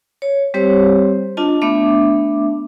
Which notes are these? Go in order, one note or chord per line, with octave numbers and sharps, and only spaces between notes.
C#5
G3 C4 G4 C5 C#5
D4 F4 D#5 A5
A3 B3 D4 E5 D6